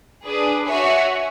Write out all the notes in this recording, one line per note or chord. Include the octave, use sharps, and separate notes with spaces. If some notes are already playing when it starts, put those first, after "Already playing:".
D4 G#4 B4
F#4 C#5 E5 G#5